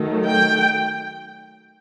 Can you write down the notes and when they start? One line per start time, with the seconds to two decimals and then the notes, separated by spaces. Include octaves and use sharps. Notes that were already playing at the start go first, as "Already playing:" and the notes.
Already playing: D#3 F#3 A3
0.25 G5